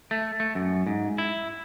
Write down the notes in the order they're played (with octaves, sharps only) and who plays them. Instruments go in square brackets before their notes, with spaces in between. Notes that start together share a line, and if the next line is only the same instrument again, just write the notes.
[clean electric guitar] A3
A3
F#2
G#2
E4